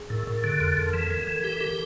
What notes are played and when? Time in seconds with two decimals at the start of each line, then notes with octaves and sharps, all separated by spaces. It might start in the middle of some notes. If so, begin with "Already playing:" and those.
Already playing: G#4
0.10 A2 A#4
0.27 A2 A#4
0.44 D3 A4
0.60 F2 A4
0.77 F2 A#4
0.94 E3 A4
1.05 A#4
1.11 E3
1.17 A4
1.27 E3 A#4
1.41 G4 A4
1.53 A#4
1.61 G4 A4